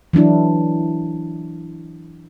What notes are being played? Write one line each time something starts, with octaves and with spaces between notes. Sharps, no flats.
E3 F#3 D4 E4